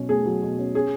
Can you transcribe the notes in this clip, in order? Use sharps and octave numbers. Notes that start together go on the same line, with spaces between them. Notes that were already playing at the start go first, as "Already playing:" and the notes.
Already playing: B2 F#3 C#4
A3 G#4
F#3
B2
C#4
C#4 G#4